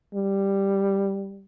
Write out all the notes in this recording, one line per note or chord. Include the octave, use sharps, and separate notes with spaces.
G3